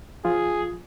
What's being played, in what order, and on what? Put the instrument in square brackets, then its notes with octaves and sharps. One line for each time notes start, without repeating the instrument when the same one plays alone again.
[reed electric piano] F3 F4 [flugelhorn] G#4